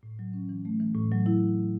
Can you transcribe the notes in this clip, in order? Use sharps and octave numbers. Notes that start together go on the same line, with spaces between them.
A2
F#3
C#4
E3
A3
E3
A2
F#3
E4